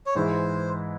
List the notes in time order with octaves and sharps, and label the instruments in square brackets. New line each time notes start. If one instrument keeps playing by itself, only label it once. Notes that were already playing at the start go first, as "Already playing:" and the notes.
[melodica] C#5
[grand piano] G#2 E3 G#3 E4 [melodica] C5